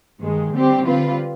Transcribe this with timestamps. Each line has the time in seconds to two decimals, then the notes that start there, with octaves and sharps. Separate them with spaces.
0.21 G2 D#3 G#3
0.53 D3 G3 C4 G4
0.86 D3 G3 C4 F4 B4